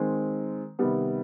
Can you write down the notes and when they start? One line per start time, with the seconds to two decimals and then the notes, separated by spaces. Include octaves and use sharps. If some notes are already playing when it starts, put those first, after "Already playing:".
Already playing: D#3 G#3 C4
0.79 C3 D#3 G3 B3